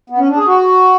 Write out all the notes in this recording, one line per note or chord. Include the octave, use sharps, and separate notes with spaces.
B3
C#4
D4
G#4
F#4